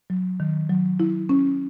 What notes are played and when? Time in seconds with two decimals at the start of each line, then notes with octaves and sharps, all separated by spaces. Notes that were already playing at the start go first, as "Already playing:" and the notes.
0.10 F#3
0.40 D#3
0.70 F#3
1.00 E4
1.29 C#4